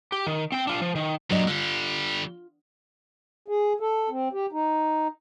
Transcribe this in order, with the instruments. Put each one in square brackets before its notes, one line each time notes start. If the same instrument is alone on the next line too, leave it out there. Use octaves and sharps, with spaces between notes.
[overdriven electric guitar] G4
D#3
C4 G5
D4 F4
F3
D#3
[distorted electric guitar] F#2 A#2 [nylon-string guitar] F#3 D4 D#5
[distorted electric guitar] D3 G3 [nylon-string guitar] F4
[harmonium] G#4
A4
C4
G4
D#4